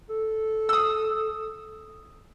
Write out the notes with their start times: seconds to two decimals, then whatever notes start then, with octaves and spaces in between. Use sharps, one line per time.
0.10 A4
0.69 D#6 E6